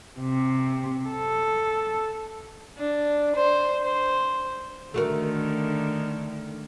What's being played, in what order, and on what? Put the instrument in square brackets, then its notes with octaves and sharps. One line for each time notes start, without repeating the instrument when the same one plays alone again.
[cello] C3
A4
[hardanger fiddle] D4
C5
C5
[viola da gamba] D3 D#3 [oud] A3 F#4 A#4